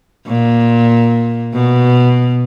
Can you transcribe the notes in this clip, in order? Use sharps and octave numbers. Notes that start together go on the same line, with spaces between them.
A#2
B2